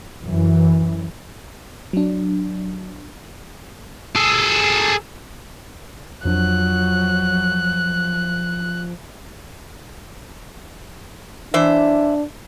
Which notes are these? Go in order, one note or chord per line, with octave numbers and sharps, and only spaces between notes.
F#2 E3
F#3 D4
G#4 A4
F2 F3 F#3 D4 F#6
E3 D4 C5 E5